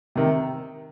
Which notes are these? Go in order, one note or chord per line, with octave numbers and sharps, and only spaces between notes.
C3 D#3